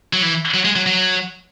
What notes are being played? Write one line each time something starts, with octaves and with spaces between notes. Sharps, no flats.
F#3
E3
F#3
G#3
F#3
F#3